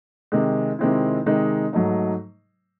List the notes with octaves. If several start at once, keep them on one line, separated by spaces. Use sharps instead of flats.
C3 D#3 G#3
C3 D#3 G#3 C4 E4
C3 D#3 G#3 D#4
G#2 F#3 A3 D#4